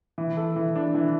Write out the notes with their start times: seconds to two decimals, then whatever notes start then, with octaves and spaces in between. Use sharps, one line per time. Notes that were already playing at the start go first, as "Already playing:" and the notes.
0.18 E3
0.37 A4
0.56 E3
0.75 D4
0.95 E3